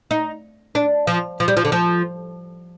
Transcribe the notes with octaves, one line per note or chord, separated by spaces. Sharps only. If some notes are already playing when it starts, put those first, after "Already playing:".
D#4
D4
F3
F3
G3
F3
D3
F3